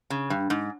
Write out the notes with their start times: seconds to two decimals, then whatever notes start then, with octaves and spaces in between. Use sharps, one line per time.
0.10 C#3
0.30 G2
0.50 G#2